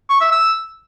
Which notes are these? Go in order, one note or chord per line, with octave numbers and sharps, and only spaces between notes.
C#6
E5
E6